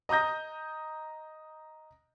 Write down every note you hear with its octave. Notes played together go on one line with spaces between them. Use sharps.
D#5 A#5 D#6 G6 A#6